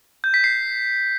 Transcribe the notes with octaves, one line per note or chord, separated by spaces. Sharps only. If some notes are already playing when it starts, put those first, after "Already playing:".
G6
B6
C7